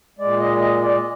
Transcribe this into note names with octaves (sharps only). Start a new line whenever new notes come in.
A#2 G#3 D5
D#5
D#5
D5